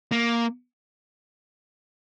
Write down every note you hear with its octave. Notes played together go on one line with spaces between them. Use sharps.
A#3